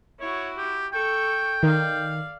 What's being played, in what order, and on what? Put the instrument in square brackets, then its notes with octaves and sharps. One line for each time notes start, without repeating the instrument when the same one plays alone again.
[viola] E4 F#4 [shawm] C#5
[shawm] G4
[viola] A4 C#6 [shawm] G5
[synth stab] D#3 [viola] D5 F5